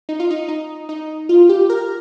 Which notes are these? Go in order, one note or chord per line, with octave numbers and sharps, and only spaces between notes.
D#4
F4
D#4
D#4
D#4
F4
G4
A#4